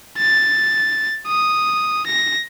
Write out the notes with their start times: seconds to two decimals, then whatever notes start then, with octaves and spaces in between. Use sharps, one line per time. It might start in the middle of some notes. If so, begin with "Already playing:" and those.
0.18 A6
1.27 D#6
2.07 A#6